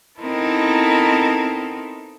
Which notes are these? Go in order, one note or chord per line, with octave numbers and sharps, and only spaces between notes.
B3 C4 D#4 E4 A4 A#4